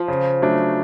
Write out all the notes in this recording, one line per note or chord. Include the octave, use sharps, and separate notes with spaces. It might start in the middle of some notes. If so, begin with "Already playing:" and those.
Already playing: F3
C#3
F#3 A3 D4